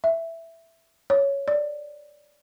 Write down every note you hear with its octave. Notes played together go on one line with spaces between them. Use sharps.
E5
C#5
D5